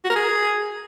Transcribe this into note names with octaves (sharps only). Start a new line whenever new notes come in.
F#4
A#4
G#4